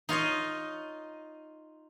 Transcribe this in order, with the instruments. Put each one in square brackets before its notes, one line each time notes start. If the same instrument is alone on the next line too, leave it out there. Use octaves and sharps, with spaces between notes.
[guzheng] D#4 F4 C#5 D#5